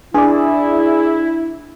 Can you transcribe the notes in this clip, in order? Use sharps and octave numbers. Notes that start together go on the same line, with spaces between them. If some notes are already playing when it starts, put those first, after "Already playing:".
D4 E4 G#4 D5